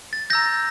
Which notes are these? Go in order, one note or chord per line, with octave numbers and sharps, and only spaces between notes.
A6
A#5 E6 G6 A#6